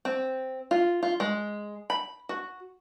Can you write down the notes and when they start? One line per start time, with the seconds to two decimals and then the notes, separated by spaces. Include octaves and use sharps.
0.05 C4
0.71 F4
1.03 F4
1.20 G#3
1.90 B5
2.29 F#4